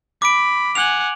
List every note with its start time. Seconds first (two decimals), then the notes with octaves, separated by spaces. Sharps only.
0.22 B5 D6 D7
0.75 F#5 G#5 F7 F#7